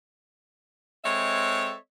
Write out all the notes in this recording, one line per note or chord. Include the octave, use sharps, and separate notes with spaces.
G#3 C4 A4 C#5 D#5 E5